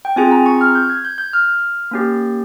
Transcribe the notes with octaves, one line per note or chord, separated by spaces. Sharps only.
G5
C4 F4 G#4 G#5
A#5
C#6
F6
G6
G#6
G6
G6
F6
A#3 C#4 G4